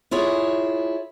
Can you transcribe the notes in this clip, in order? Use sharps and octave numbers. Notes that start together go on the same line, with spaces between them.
E4 F4 G#4 C#5